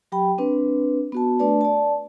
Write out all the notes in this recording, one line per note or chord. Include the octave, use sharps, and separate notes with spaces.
F#3 G4 G5 B5
C4 D4 B4
B3 F#4 A5
A3 D4 B4 D5 A5
D5 A5